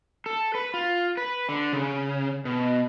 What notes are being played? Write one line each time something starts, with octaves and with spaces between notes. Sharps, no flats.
A4
B4
F4
B4
D3
C#3
B2